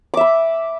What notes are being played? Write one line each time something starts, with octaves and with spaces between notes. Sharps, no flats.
E5 B5 D6